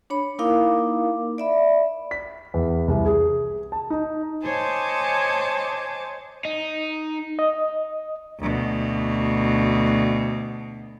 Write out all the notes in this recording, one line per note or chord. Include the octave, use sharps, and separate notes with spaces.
D4 C#5 B5
A#3 D#4 E4 A#4 F5 D6
D5 E5 B5
B6
E2
C2
G#4
A5
D#4
C5 C#5 D#5 G#5 A5 D6
D#4
D#5
D2 B2